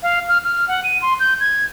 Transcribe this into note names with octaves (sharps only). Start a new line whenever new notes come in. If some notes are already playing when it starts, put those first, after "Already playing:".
F5
F6
F6
F#5
D#7
C6
G6
G#6